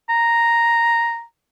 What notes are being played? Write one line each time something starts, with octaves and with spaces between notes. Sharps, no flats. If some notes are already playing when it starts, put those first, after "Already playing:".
A#5